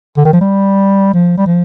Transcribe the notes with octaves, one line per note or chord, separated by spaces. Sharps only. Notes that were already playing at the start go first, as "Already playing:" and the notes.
D3
D#3
F3
G3
F3
G3
F3